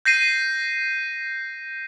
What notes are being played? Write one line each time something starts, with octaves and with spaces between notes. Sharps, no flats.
G6 A#6 C7 D#7